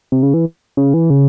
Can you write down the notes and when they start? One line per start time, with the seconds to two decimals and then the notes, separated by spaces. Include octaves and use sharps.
0.12 C3
0.23 C#3
0.34 E3
0.77 C#3
0.94 E3
1.10 C#3